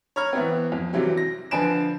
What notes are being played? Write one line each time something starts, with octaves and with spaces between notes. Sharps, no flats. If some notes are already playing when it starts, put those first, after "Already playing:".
C#5 A#5 B5 F6 G#6
E3 B3 C4
F2
C3 E3 F#3 G3
A#6
D3 F3 B4 G#5 D7 E7